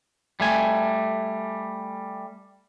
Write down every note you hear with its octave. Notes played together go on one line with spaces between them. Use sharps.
G3 A3 G#5